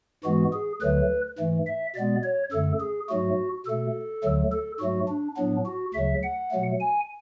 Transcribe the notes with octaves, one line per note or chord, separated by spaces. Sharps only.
G#2 E3 G#3 B3 F#4
G#4
D2 D3 F#3 A3 B4
G#2 E3 A3
E5
B2 G#3 B3 D5
C#5
F#2 D3 A3 A4
G#4
G#2 F#3 A3 F#4
B2 A3 A4
D2 D3 F#3 A3
A4
G#2 F#3 A3 F#4
D4
A2 F#3 B3 D4
F#4
D2 C#3 F#3 E5
F#5
B2 F#3 A3
G#5